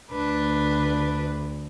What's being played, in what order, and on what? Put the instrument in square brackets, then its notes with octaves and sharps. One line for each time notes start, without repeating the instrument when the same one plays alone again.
[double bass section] D2 [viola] D4 B4